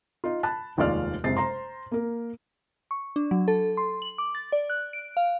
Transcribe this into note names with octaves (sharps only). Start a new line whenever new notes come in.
D#4 F4
A5 B5 F#6
F1 D#2 G#3 F4 D5 F6
F#1 C3 G#3 A6 C7
C5 A#5 C6
A#3 A#4
C#6
D4
F#3
A4
C6
F#7
D6
A6
D5
F#6
D7
F5